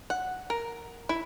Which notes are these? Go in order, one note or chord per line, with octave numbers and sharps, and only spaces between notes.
F#5
A#4
E4